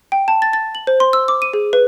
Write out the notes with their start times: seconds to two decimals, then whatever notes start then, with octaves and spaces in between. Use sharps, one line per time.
0.12 G5
0.28 A5
0.42 A6
0.53 A6
0.75 F#7
0.87 C5
1.00 C6
1.13 E6
1.28 D6
1.42 D#7
1.53 G#4
1.73 B4